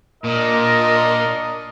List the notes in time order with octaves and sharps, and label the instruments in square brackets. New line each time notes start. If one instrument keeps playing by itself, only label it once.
[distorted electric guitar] A#2 [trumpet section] D4 A#4 D#5